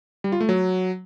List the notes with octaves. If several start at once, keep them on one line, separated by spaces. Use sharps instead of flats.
G3
F4
A3
F#3